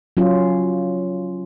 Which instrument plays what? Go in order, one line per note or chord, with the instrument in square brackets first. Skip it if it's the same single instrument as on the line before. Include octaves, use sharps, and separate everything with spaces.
[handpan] F#3 C#4 F4